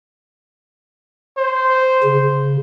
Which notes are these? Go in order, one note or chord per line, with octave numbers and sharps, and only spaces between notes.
C5
C#3